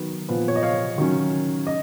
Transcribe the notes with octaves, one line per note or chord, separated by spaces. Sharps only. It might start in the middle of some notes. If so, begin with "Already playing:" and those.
Already playing: D#3 F#3 B3
A#2 F3 B3
C#5
D#5
C#5 F5
D#3 F#3 C#4
D#5